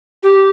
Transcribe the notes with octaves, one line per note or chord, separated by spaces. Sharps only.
G4